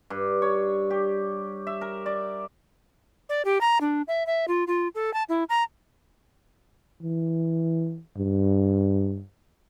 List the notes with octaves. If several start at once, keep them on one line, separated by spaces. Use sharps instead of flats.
G2
C#5
G4
E5
A#4
D5
D5
G4
A#5
D4
E5
E5
F4
F4
A4
A5
E4
A#5
E3
G2